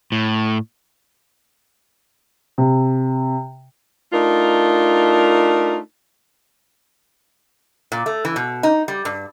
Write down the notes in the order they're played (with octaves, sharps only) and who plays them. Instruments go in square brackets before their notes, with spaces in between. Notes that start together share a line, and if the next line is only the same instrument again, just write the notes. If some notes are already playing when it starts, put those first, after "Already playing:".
[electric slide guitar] A2
[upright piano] C3
[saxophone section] A3 D4 D#4 F4 A#4
[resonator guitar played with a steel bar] A#2
A3
E3
B2
D#4
G3
G2